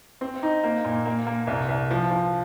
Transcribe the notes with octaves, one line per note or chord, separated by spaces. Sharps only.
C4
D#4
A#3
A#2
A#3
A#3
C2
C2
F3
F3